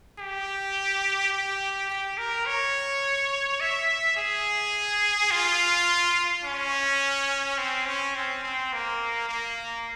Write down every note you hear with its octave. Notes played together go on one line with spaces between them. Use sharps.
G4
G4
G4
A#4
C#5
E5
G#4
F4
C#4
C4
C#4
C4
C4
A#3
A#3